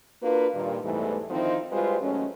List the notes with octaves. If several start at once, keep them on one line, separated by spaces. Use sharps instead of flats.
A#3 D4 F4 F#4 B4
G2 A#2 D#3
E2 G#2 E3 G3 A3
D3 D#3 F3 C4 D#4 E4
G3 G#3 F4 F#4 B4 C5
D#2 F#3 G#3 A3 C#4